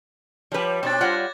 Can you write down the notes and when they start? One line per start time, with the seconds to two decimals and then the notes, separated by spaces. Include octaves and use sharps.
0.52 F3 G3 G4 B4 C#5 G5
0.83 B2 C4 D4 D6 A6
1.01 G3 F4 F#5 F#6 G#6 A#6